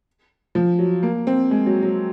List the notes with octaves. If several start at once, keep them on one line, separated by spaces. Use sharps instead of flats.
F3
F#3
A#3
C4
G#3
F#3
F#3